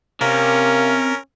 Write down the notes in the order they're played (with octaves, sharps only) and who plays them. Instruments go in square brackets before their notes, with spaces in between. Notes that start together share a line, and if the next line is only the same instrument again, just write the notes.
[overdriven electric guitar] C3 [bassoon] A#3 [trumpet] C#4 [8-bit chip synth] A#4